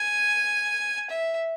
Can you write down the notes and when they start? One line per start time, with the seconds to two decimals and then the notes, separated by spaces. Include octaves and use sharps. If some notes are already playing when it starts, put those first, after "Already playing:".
Already playing: G#5
1.10 E5